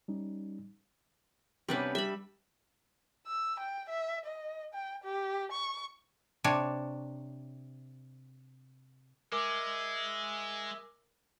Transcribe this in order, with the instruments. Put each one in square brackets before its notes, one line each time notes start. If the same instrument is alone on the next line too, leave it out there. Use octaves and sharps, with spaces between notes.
[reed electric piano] G3 C#4 D#4
[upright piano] C3 B3 C#4 [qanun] G3 D4 B4
[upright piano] G3 [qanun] E5 B5
[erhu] E6
G5
E5
D#5
G5
G4
C#6
[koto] C3 D4 C#5
[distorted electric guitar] G#3 [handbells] A#4 D6 [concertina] E5